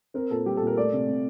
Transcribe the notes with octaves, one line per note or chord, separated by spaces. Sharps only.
C4 A#4
A#2 A4
G3 G4
A4
A#2 A#4
A3 D5
C3
C3